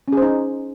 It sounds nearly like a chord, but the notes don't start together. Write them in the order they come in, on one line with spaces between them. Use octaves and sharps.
C#4 G#4 C5 D#4